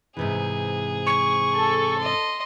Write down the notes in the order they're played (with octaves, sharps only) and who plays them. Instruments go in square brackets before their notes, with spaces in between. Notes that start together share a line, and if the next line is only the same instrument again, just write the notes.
[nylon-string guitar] G#2 C3 E3 [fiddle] G#4
[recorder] C#6
[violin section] A4
[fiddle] D#5 C6